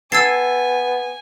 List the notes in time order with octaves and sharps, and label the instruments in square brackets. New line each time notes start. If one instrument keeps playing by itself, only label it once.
[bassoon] B3 [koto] A4 [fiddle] G#5 [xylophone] E6 G#6 C7